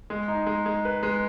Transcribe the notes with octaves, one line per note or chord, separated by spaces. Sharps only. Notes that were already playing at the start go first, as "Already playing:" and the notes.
G#3
D#4
G#3
G#3
B4
G#3